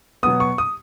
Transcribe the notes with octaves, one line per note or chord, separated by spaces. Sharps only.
B2 F#3 B3 D#6
C#6
D#6